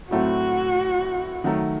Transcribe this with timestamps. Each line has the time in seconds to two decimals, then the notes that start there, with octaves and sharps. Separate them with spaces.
0.11 A2 F#3 A3 C4 E4 F#4
1.44 D#3 F#3 A3